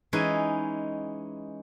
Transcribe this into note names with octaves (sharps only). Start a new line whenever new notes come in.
E3 G#3 C#4 D#4 B4 G#5